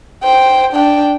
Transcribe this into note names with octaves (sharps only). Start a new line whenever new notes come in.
C5 G5
D4 G5